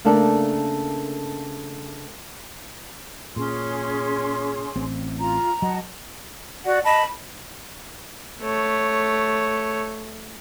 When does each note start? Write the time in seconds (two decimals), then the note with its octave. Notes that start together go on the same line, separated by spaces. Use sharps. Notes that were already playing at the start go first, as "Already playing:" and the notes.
0.05 C#3 A3 A#3 D4 A4 A#4
3.36 A#2 C#4 G#4 C6
4.76 A1 C4
5.20 F4 A#5
5.62 F#3 D#5 F#5 A5
6.65 F#4 D5 F#5
6.85 D#5 A5 B5
8.42 A3 C#5